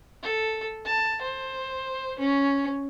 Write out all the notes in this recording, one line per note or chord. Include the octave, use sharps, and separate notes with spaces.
A4
A5
C5
C#4